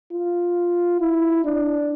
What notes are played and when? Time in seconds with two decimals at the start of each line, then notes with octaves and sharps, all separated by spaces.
0.13 F4
1.01 E4
1.45 D4